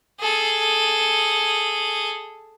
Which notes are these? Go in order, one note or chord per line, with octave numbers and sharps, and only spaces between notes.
G#4 A4